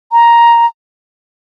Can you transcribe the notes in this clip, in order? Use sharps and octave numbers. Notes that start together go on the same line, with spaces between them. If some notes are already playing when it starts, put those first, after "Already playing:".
A#5